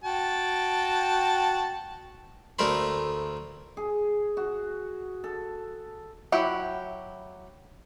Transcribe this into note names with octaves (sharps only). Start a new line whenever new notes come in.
F#4 G5 A5
D2 A3 A#4 C5 B5
G#4
F#4
A4
F#3 E4 G4 F#5